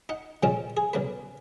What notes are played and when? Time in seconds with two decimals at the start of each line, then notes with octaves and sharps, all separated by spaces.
0.09 D#4 F#5
0.43 A#2 C#3 F3 G#3 C4 C#4
0.77 G#4
0.93 B1 C#3 A#3 B4